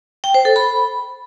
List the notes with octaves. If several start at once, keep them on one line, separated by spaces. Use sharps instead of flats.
G5
C5
A4
B5